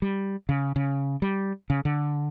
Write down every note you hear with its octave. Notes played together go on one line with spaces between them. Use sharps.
G3
C#3
C#3
G3
C#3
D3